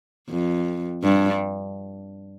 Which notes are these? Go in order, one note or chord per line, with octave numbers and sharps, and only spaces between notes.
F2
G2